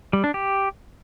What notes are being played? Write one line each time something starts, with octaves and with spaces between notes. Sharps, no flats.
G3
D4
G4